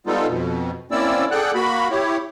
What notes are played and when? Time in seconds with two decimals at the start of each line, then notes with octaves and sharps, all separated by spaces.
0.07 G3 G#3 B3 D#4 F4 A4
0.28 F2 B2
0.91 A#3 C4 C#4 E4 D5 E6
1.31 G#4 A4 D5 F#5 G5 F#6
1.55 A#3 F#4 B5
1.90 E4 G4 C#5